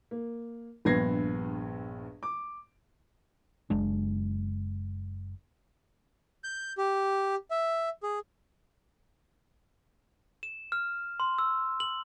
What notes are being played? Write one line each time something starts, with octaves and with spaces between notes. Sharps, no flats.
A#3
A#1 G2 B3 G#6 A#6 C7
D6
F#1 G#3 D4
G6
G4
E5
G#4
E7
F6
C6
E6
F#7